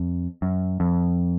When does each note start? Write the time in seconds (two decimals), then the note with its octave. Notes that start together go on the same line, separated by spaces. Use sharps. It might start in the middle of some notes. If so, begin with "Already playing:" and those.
Already playing: F2
0.42 F#2
0.80 F2